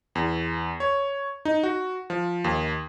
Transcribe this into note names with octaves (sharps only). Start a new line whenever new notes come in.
E2
C#5
D#4
F#4
F3
D#2